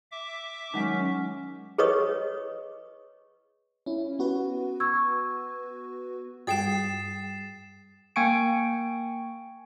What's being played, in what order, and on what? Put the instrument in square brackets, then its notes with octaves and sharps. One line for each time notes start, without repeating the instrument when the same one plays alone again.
[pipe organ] E5 D6
[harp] D#3 F#3 G#3 [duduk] C#4 [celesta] D#4 F#5 B6
[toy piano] G#4 B4 C#5 D#5 C#6 D#6
[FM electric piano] C#4 E4
B3 F#4 B4
[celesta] C#6 E6 G#6
[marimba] G2 G3 [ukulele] G#4 G5 [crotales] A6 C7 E7
[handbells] A#3 G5 G#5 C#6 C#7 D7